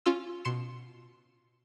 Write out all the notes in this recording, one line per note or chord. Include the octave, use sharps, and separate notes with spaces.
C#4 F4 C6 E6
B2 C6 C#7 E7